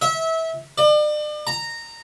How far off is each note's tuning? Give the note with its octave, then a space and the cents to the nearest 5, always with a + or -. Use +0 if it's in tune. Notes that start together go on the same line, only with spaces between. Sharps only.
E5 -25
D5 +40
A#5 -15